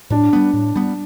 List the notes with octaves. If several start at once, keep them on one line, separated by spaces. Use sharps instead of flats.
A2 D4
G3 B3
A2
G3 B3